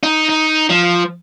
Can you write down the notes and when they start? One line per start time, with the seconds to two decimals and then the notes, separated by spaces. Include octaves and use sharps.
0.03 D#4
0.29 D#4
0.70 F3